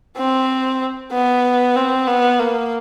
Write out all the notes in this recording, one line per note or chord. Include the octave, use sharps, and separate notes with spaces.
C4
B3
C4
B3
A#3